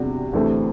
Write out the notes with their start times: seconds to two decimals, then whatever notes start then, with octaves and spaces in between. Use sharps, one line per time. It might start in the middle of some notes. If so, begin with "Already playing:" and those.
Already playing: E2 C3 G3 D4 F#4
0.33 D2 C3 E3 A3 C4